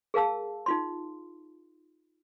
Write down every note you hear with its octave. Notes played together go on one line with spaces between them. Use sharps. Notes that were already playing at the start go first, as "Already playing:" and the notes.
G#4 A#4 F5 A5 E6
D#4 F4 C6